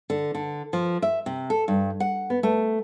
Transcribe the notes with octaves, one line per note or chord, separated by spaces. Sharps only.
D3
D3
F3
E5
C3
A4
G2
F#5
B3
A3